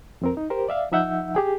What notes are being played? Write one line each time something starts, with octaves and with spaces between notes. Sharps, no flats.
F2 C4 A#4
D#4
G4 A#4 C5
D5 E5 F5
F3 D#4 E5 F#5 E6 G6
G4 G#4 G5